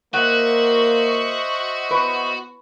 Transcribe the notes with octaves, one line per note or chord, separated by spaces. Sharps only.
A#3 F#4 C5 D#5 E5 F#5
B3 B4 C#6